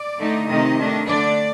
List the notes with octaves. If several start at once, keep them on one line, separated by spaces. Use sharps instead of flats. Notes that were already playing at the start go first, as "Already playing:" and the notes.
Already playing: D5
D3 A3 D#4
C3 D#3 A3 D#4 D#5
D#3 A3 D4
D3 A3 D4 D5